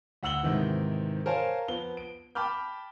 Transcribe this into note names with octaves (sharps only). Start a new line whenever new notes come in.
D2 F#5 E6 F#7 G7
G#2 C3 D#3 E3
A#4 C5 C#5 F5 G#5 A5
F3 B3 G7
D7
G5 A5 B5 D6 F6 G6